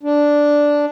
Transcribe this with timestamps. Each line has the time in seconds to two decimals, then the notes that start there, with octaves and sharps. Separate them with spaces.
0.03 D4